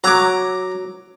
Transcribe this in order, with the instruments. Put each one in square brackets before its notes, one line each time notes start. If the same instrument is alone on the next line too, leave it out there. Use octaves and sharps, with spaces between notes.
[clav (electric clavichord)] F#3 [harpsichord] A#5 D6